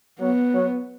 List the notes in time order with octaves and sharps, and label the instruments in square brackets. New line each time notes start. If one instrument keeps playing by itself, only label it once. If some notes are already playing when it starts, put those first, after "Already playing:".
[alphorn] F#3 [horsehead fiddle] B3
[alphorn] F#3